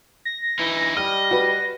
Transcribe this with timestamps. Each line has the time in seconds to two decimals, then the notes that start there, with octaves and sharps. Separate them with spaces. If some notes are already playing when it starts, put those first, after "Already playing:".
0.25 A#6
0.59 E3 D#4 E4
0.97 G3 D#5 F6
1.31 F#4 B4